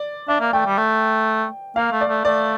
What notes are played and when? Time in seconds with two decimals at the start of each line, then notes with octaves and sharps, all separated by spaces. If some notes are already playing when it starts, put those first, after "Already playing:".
Already playing: D5
0.28 D4 E5
0.41 A#3
0.53 A3 G5
0.66 G3
0.78 A3
1.76 A#3 F5
1.92 A3
2.01 D5
2.09 A3
2.25 A3 D5